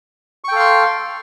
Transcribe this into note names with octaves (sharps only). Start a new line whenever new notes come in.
A4 F5 G5 C6 C#6